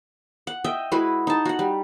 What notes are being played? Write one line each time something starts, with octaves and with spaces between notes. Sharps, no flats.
F#5
D#5 E5 G5
G#3 E4 F#4 B4
D#4 A5
F#4 F#5
G3